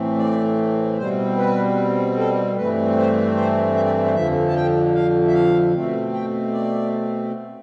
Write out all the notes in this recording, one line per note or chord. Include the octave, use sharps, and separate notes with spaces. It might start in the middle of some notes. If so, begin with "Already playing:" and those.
Already playing: A2 E3 A3 C4
D5
B2 G3 C4 C5
B4
A4
G2 E3 A3 C4 B4
C5
C5
E5
D5
C5
F2 D3 F3 E5
A5
G5
F5
E5
F5
B2 A3 C4
G5
D5